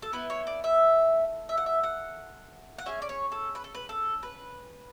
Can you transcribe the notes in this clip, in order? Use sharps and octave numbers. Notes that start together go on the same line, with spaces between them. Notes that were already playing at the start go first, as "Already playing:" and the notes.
A4
B3 E4 A4 B4
C#5
D5
E5
E5
F#5
E5
F#5
F#5
C#4 G#4 E5
D5
C#5
A4
B4
A4
B4
A4
B4